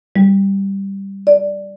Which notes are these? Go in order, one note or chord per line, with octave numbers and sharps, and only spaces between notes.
G3
D5